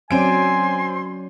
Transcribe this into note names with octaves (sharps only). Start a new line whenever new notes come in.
F#3 C4 C#4 D5 G#5 C6 D7